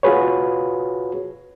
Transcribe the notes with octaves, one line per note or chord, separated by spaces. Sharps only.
F4 F#4 G#4 B4 C#5